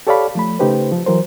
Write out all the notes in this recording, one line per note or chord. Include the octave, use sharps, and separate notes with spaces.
G4 A4 C#5 D5 F5 B5
F3 A3 B5
C#3 A3 D#4 G4 B4 C5
F3
E3 F#3 A#4 C5